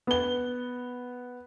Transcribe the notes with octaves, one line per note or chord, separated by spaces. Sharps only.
B3 G7